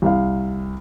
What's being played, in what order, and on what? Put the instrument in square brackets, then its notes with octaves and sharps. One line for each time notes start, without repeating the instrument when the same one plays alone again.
[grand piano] C2 F5